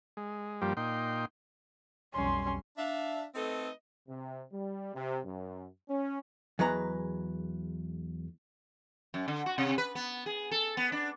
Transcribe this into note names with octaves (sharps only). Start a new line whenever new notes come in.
G#3
G2 F3 G3 A#3 G4 C5
A#2 D#4 G5 C6
B1 F2 G3 C#4 C6
D4 E5 F5
A3 C4 D#4 A4 B4 D#5
C3
G3
C3
F#2
C#4
E2 F#3 G#3 B4 A#5
F#2
D3
F#4
C3
B4
B3
G#4
A4
B3
D4